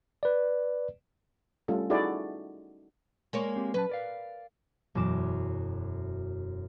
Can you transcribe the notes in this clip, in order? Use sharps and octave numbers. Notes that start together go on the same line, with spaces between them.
B4 D5
G3 A3 C#4 F4 A4
D#4 E4 F#4 G#4 A4 D5
G#3 A#3 C#5
C4 G4
F#3 C#4 B4 A5
A#4 D5 F5
E1 F#2 F#3 D6 E7